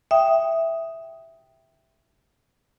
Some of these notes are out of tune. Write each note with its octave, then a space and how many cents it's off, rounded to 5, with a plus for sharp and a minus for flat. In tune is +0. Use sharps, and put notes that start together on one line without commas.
E5 +0 G5 +0 D#6 +0